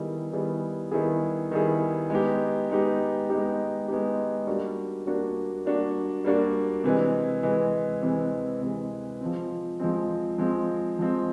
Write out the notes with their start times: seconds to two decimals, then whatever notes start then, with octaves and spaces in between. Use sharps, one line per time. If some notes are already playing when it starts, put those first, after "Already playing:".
Already playing: D#3 G3 B3 E4 G#4
0.32 D#3 G3 B3 E4 G#4
0.92 D#3 G3 B3 E4 G#4
1.51 D#3 G3 B3 E4 G#4
2.10 G#3 B3 D#4 G4
2.70 G#3 B3 D#4 G4
3.29 G#3 B3 D#4 G4
3.88 G#3 B3 D#4 G4
4.47 G3 A#3 D4 F#4
5.06 G3 A#3 D4 F#4
5.65 G3 A#3 D4 F#4
6.24 G3 A#3 D4 F#4
6.84 C3 E3 G#3
7.43 C3 E3 G#3
8.02 C3 E3 G#3
8.61 C3 E3 G#3
9.20 F3 G#3 C4
9.80 F3 G#3 C4
10.38 F3 G#3 C4
10.99 F3 G#3 C4